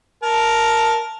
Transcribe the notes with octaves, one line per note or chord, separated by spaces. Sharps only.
A#4 A5